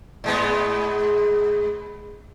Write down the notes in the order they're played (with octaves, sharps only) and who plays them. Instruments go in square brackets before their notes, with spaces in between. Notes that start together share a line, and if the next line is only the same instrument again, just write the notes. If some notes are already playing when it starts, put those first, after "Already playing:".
[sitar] G#2 G#3 B3